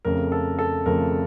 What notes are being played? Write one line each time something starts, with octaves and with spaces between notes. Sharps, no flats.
F2 C#3 F3 A3 A#4
A4
A4
F2 C#3 F3 A3 A#4